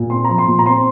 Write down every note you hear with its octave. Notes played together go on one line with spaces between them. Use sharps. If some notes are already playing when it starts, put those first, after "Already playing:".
Already playing: A#2
C4 C6
F3 A#5
C6
A#2
A#5
C4 C6